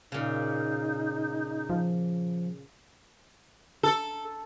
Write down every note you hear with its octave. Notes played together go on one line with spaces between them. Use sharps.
A#2 C#3 D#4
F3
A4